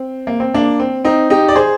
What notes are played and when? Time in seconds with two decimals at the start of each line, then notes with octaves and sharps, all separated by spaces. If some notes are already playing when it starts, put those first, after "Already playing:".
Already playing: C4
0.27 A#3
0.40 C4
0.54 A#3 D4
0.80 C4
1.05 C4 D#4
1.30 D#4 G4
1.48 D5
1.56 G#4 C5